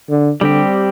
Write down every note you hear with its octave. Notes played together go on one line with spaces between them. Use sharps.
D3
D3 G3 C4 G4